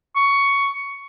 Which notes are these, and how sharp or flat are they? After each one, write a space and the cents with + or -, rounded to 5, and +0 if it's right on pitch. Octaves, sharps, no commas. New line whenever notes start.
C#6 +10